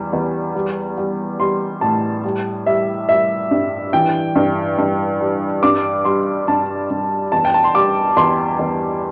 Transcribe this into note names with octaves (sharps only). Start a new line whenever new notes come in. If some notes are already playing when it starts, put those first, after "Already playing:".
Already playing: E2 E3 G3
E2
G3
G3
G3 C6
A2 A5
G3
G3 E5
G3 E5
G2
E3 G5
G2
G2
G3
G2 D6
G3 C6
G2 A5
G2
E2 A5
G5
A5
C6
G3 D6
E2 C6
E2